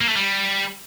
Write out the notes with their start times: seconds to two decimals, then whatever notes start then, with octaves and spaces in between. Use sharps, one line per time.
0.01 A#3
0.08 A3
0.16 G3